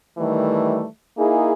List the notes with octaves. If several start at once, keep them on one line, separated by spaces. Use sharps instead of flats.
D#3 E3 G3 A3
A#3 D#4 E4 G#4